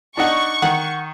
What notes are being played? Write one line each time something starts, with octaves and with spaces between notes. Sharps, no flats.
D4 D#4 F#5 C#6
D#3 F#5